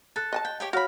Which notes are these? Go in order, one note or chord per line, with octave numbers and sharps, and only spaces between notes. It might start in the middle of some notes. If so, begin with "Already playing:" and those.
A4 F#6 A6
D#5 G#5 A5
G5
G4 C#5 G5
F#4 C#5 F5 B5 F6 A#6